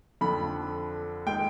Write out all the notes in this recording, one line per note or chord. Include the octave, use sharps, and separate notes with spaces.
F2 D3 F3 B5
D#3 G#3 G5